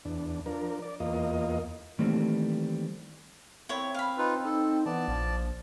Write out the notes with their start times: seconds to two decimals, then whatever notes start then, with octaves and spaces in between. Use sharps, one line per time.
0.05 E2 D4
0.46 F3 D4 A#4
0.82 D5
1.00 E2 A#3 F4 D#5
1.99 D#3 E3 G3 A3 A#3 C4
3.69 C4 E4 C#5
3.94 F5 B5
4.18 D#4 F4 B4
4.45 D#4 A4
4.86 E3 B3 D5 A5
5.08 A#1 F3